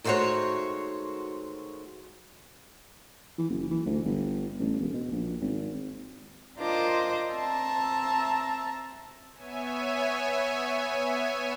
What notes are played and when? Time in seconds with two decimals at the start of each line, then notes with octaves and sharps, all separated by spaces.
0.04 D#3 G#3 A3 F#4 C5 C#5
3.38 E3
3.50 F#1
3.71 E3
3.86 D2
4.05 G1
4.60 A1
4.80 E1
4.94 B2
5.11 A#1
5.41 G#1
6.58 D4 F4 A#4 C5 D#5 D6
7.33 C4 E5 A5 A#5
9.34 B3 C#5 E5 G#5